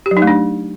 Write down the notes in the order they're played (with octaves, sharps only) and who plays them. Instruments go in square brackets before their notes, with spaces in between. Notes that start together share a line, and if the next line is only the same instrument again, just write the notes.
[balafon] G4
F#3
D#4
A3
D4